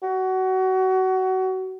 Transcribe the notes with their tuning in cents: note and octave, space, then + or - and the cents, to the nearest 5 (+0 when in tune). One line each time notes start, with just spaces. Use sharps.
F#4 +25